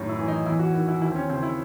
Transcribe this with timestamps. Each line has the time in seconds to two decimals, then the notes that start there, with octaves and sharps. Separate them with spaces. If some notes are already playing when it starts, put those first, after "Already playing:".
Already playing: F#2 A2 D#3
0.09 E4
0.19 E3
0.28 D#4
0.46 E2 E4
0.59 F#4
0.73 D#3 E4
0.88 E4
1.01 D#2 E4
1.12 C4
1.15 C#4
1.29 C#3 C4
1.43 E4